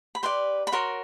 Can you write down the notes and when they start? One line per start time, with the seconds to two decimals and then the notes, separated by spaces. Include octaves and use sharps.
0.15 B5
0.23 G4 B4 D5 C6
0.67 B5
0.72 F#4 A#4 C#5 C6